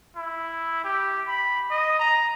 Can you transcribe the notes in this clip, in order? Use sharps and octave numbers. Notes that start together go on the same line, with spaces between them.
E4
G4
B5
D#5
A#5